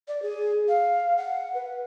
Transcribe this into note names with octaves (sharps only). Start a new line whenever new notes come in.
D5
G#4
F5
F#5
B4